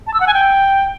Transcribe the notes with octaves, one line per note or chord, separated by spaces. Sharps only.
A5
E6
F#5
G#5
G5